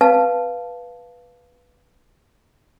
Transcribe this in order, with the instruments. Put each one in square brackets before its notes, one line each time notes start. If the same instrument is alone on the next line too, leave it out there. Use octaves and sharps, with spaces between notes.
[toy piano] B4 F5 A5